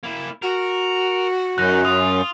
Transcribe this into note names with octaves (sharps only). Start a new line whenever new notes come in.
A#3 E4
F#4 A#4
F#2 D#3 D#4 F#6 A#6
F4 D#6